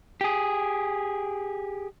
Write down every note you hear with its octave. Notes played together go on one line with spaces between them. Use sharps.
G4 G#4